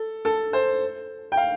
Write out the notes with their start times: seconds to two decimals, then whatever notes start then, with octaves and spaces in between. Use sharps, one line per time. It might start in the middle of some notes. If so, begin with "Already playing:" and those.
Already playing: A4
0.25 A4
0.53 C5
1.32 G5
1.37 F5